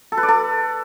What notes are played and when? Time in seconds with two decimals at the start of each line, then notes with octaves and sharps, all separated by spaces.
0.12 A4
0.17 B4
0.23 D5
0.28 A4